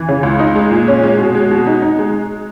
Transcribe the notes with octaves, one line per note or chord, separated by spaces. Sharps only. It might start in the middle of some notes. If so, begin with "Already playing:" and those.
Already playing: E3
C#3
C#2
D#4
G#3
A#2
C#4
G#3
B2
G#3
B2
D#4
D#4
G#3